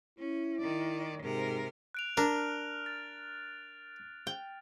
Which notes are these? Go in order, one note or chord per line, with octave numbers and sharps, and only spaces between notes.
C#4 E4
D#3 D5
G#2 C3 A#4
F#6 D7 F7
D4 A#4 F6
A6
G5